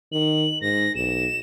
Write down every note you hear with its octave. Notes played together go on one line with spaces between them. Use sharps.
D#3 F#7
G#2 A#6
B1 E7